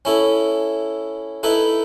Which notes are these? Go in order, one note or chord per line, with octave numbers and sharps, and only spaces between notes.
C#4 E4 A4
D#4 E4 A4 B4